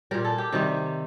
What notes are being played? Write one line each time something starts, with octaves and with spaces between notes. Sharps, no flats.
A#2 G3 A#4
A4
G4
C3 D#3 G3